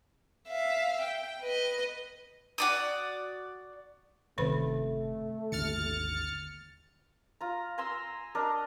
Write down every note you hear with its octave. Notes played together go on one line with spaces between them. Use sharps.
E5 F5
G5
B4 D#5
F#4 D5 D#6
G1 C3 D#3 A3 B4 B5
G#1 D#2 D3 F6 A6 C#7
F4 A#5
G#5 A#5 C6 E6
D4 A#4 D#5